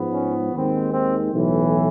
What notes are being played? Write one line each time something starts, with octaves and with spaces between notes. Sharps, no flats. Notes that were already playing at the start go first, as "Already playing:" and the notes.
Already playing: G#2 F3 G#3 B3
C#4
D#2 D#3 G#3 C4
C4
B1 A2 E3